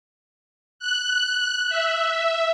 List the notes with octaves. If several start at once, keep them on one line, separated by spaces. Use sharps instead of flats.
F#6
E5